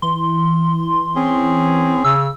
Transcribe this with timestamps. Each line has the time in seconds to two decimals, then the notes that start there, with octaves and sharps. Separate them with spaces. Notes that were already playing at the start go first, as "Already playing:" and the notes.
0.02 E3 C6
1.16 C4 C#4 G#4
2.04 C#3 E6